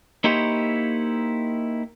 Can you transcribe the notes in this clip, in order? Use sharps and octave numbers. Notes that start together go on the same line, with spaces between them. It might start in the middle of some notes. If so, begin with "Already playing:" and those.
A#3 D#4 E4 G4 C5 C#5